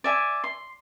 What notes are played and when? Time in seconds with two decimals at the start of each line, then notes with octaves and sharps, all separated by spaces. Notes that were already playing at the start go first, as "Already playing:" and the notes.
0.04 D5 E5 G#5
0.44 C6